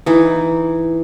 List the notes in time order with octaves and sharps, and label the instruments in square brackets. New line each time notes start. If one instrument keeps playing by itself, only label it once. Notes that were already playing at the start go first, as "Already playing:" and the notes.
[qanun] E3 D#4